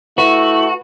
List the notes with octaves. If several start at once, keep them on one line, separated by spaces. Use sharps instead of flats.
A3 E4 F#4 B4